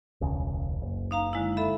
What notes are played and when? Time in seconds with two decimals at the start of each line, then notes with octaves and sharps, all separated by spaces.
0.21 E1 C#2 C#3
0.82 F#1
1.11 D#4 F5 A#5
1.33 D3 G#3 E4
1.57 A4 E5 B5